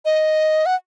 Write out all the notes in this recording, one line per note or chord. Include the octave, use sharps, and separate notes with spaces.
D#5
F#5